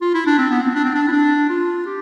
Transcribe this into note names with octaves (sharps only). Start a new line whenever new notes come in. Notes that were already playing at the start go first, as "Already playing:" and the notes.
F4
E4
D4
C4
B3
C4
D4
C4
D4
E4
D4
F4
G4